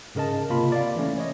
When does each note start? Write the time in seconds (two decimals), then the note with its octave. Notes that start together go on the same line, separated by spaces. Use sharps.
0.15 G#2 C#3 A#4 D#5 A5
0.50 C3 A#3 F4 B5
0.72 D5 F5
0.96 E3 A3 C#4
1.18 C#5 D#5